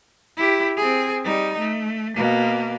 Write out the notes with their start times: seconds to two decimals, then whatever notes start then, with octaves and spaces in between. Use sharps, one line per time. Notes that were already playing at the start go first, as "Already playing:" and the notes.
0.37 E4 G4
0.77 C4 G#4
1.24 G3 D#4
1.58 A3
2.16 B2 A#3